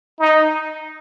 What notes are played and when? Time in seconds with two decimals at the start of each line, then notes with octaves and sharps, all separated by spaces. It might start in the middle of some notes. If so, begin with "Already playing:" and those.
0.19 D#4